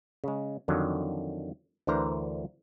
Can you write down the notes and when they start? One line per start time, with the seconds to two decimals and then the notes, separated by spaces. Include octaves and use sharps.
0.24 C#3 G#3
0.68 F2 D3 D#3 F#3
1.87 D2 D3 E3 A#4 C5 A#5